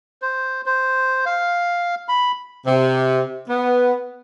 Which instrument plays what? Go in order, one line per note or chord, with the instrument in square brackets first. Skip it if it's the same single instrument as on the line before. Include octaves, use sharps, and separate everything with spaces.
[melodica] C5
C5
F5
B5
[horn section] C3
B3